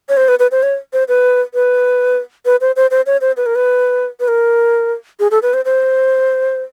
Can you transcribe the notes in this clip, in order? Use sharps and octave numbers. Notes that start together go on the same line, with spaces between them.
C#5
C5
B4
B4
C5
C#5
C5
B4
B4
B4
C5
C5
C5
C#5
C5
B4
A#4
B4
B4
A#4
G#4
A4
B4
C5
C5